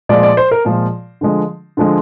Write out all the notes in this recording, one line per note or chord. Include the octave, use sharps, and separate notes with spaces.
A#2 F3 G#3 D5
D5
C5
A#4
A#2 F3 G#3
D3 F3 G#3
D3 F3 G#3